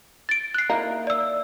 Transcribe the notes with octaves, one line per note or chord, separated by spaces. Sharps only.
A6 D7
F#6 C7
A#3 D#4 E4
D5 E6